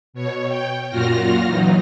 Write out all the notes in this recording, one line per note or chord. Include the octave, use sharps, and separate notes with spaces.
B2 C#5
G5
F#2 A#2 F4 F#4 F6 A#6
E3 F#3 D#4